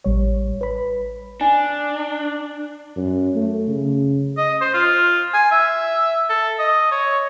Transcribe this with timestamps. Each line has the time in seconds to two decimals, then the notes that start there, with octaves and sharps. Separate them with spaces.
0.04 A1 G3 C#5
0.61 B4 B5
1.41 D4 G#5
2.96 F#2
3.35 A3
3.68 C#3
4.37 D#5
4.61 C5
4.74 F4
5.33 G#5
5.51 E5
6.30 A4
6.59 D#5
6.91 C#5